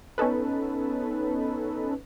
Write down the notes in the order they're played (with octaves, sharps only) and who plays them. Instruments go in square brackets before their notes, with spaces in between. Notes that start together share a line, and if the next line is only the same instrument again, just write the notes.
[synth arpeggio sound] B3 C#4 D#4 A4 B4